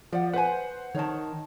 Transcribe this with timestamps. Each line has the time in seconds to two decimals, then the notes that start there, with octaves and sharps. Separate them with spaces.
0.13 F3 D5 F#5
0.34 B4 C5 F#5 G#5
0.95 D#3 C#5 A5